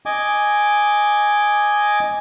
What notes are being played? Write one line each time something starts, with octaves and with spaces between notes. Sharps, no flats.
D#5 G#5 D6